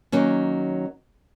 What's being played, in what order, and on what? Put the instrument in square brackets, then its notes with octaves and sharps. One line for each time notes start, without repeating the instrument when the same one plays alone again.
[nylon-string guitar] D#3 F#3 A#3 C#4